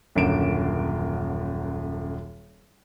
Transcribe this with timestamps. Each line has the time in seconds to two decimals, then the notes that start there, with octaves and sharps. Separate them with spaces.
0.15 D#1 F#2 D3 A#3 D7 E7